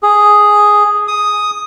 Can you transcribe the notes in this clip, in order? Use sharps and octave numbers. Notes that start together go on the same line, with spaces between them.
G#4
D#6